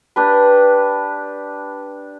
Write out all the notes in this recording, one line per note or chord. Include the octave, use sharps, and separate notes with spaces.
D4 G4 B4